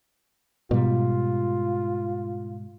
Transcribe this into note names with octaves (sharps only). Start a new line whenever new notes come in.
G#2 B2 G3 F4